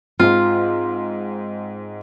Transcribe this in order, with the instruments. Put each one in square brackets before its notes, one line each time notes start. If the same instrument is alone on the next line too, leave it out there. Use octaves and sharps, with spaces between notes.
[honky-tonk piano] G#2 C4 [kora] F4